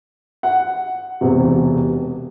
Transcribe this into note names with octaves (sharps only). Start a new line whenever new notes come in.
F#5
E1 E2 C3